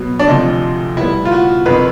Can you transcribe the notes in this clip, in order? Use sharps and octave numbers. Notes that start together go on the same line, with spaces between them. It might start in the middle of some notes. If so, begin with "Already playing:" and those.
Already playing: B2 F#3 B3
D4
D2 C3 F3 D#4
B2 G3 B3 E4
F4
F#4
F2 C3 D#3 B4